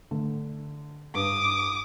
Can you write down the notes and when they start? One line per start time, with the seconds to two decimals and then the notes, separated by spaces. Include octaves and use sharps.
0.11 D3 A3
1.15 G2 D6 D#6